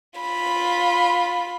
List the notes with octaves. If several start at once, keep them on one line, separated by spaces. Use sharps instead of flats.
F4 B5